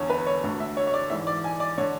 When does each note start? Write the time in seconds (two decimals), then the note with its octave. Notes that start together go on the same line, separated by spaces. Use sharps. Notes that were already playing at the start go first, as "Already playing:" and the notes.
Already playing: E2 D3 C#5
0.10 B4
0.27 C#5
0.43 D2 D3
0.60 E5
0.77 C#5
0.87 C#5
0.94 D5
1.10 G#2 E3 E5
1.27 D5
1.44 G#5
1.60 D5
1.78 D3 C#5